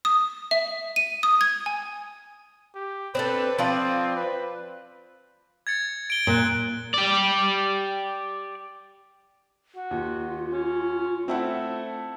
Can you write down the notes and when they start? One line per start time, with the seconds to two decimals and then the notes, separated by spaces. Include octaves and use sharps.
0.05 D#6
0.51 E5
0.96 D#7
1.23 D#6
1.41 G#6
1.66 G#5
2.75 G4
3.15 C4 D4 A4 B4
3.59 F3 C4 F4 D5
4.17 B4
5.67 G#6 A6 C#7
6.10 D7 G7
6.27 A#2 F#6 F#7
6.94 G4 D5
9.76 F#4
9.91 D#2 F4
10.52 C#4
11.28 A3 C4 E4 F#5